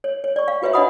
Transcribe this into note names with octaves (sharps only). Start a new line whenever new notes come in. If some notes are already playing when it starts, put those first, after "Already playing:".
C#5
C#5
D5 C#6
F5
F4 F#4 B4 C#5 E5 F5
D4 C#5 D#5 F#5 B5 D#6